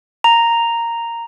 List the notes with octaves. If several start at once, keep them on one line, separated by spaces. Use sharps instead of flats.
A#5